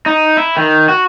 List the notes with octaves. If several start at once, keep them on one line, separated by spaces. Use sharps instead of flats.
D#4
E4
D#3
F#4